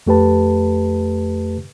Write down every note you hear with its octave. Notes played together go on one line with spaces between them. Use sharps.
F2 A3 G4 B4 A5